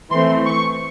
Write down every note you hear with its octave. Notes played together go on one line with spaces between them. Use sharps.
E3 A3 C4 C6
C#6